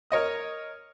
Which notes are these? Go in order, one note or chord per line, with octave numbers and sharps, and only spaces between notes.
A#4 C#5 D#5 D#6